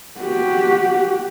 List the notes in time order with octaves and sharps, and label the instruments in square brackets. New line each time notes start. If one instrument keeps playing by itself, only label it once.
[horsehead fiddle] F#4 G4